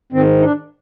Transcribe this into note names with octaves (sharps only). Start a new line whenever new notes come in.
G#2 D#3 C4
D#4
D4